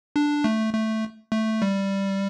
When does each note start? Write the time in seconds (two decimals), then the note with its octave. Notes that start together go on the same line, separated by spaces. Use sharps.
0.16 D4
0.44 A3
0.74 A3
1.32 A3
1.62 G3